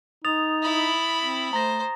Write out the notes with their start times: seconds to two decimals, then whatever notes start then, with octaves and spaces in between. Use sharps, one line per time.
0.25 D#4 D#6 A6 F7
0.62 E4 B5
1.18 C4
1.53 A3 C5 A#5 A#6